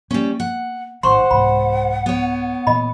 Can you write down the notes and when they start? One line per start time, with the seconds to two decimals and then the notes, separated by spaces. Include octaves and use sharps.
0.11 G3 A#3 C#4
0.40 F#5
1.03 A1 G#2 D#3 C5 F#5 C6 C#6
1.31 C2 G#2 E3 B5
2.06 B3 C#5
2.67 A#2 E3 D#5 B5